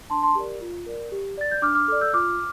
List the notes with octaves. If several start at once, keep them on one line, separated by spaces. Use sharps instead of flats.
D4 A5 C6
A5 C6
G4 A#4 D5
F4
A#4 D5
G4
D5 A6
G6
D4 D6 F6
D6 F6
A4 D5 D6 F6
E6 G6
F4 D6 F6